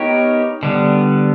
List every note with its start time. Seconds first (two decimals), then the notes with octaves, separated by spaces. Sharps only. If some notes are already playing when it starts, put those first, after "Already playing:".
Already playing: B3 D#4 G4 A#4 C#5
0.63 D3 G3 B3